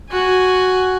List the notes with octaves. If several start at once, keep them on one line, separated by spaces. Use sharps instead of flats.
F#4 G#5